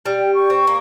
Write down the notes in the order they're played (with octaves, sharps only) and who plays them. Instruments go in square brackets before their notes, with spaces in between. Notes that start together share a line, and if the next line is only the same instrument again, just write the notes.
[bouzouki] G3
[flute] G5
C#6
[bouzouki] C4
A#3